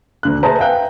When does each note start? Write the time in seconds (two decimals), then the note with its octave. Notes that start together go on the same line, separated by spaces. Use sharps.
0.23 D2 D3 F#6
0.43 G#4 B4 C5 E5 A5 A#5
0.58 B4 E5 F5 G5 F#6